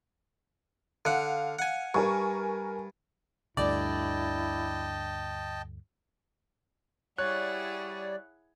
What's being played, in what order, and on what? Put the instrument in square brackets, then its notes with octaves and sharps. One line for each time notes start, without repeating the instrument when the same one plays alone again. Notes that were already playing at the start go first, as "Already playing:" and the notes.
[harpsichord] D3 F#5 [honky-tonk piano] F5
[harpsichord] F#5 G#5
[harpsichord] G2 [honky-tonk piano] A#4 G#5 C#6
[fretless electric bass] D2 G2 D3 [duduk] E4 [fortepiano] D5 [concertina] D#5 G5 A5
[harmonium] G3 D5 [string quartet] E4 G#4 F#5 [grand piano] C#5 [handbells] F#6